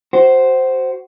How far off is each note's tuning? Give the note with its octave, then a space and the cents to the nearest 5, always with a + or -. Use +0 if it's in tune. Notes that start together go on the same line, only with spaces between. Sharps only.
F#4 +25 C5 +0